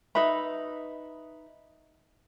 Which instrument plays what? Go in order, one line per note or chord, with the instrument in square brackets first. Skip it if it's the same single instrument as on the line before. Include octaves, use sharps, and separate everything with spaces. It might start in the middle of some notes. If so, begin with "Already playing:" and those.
[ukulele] D#4 B4 E5 B5